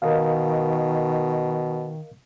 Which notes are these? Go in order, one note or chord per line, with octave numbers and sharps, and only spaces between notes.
B2 D#3 A#4 D#5 F5